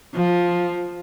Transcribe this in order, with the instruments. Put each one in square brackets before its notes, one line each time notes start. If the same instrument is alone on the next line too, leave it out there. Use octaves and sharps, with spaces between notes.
[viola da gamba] F3